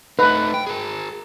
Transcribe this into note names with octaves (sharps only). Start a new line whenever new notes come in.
A3 D#4 B4
G5
G#4 A#4